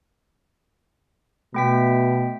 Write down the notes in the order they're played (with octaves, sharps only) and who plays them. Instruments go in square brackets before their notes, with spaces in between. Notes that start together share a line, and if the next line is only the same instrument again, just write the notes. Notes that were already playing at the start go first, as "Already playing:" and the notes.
[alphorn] B2 [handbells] A3 G5 B6